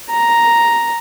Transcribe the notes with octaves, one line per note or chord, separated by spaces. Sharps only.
A#5